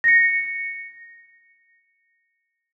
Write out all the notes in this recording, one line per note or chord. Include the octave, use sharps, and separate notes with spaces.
A#6 C#7